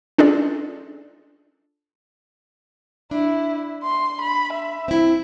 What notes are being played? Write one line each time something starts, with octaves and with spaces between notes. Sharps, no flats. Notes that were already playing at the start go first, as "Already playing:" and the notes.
C#4 D4 F4 G#4 A4 D5
D4 E4
C6
B5
E5
C4 E4